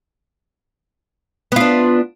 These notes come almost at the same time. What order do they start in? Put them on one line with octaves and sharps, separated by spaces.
B3 F4 D4